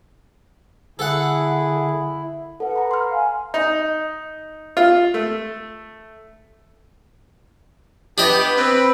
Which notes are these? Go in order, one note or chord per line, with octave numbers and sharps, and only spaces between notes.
D3 E4 G#4 A4 F#5
A4 B4 F#5
A#5 B5
C6 F6
F5 G#5
D#4
F4
A3
B3 D4 G4 D#5
C4 B4